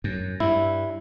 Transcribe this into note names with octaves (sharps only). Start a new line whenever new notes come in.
F#2
G2 E4